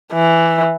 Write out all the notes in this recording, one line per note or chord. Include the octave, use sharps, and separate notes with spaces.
E3